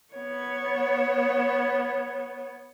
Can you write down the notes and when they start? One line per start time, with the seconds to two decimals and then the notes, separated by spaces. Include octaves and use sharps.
0.13 B3 C#5